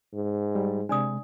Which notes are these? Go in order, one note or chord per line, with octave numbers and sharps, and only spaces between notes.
G#2
G3
C3 G#3 D4 D5 D#6